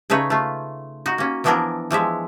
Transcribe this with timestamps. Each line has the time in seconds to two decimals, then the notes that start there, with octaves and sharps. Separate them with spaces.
0.10 C#3 A3 D#4 B4 C#5
0.30 A3 F4
1.06 D#4 F#4
1.18 A#3 C#4
1.44 E3 F3 B3 D4 E4 A#4
1.91 E3 F3 G#3 E5